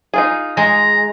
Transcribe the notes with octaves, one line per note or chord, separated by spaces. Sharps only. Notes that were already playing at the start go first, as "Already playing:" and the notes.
D#4 F4 G#4
G#3 A#5